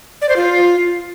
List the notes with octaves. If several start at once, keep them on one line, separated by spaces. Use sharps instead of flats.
D5
C5
F4